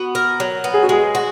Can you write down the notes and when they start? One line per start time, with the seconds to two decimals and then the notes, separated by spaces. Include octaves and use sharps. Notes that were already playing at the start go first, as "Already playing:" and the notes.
Already playing: B3 F#4
0.15 A#4
0.40 F#3
0.64 B3
0.74 G#4
0.83 F#4
0.89 G#3 G#4
1.15 F#4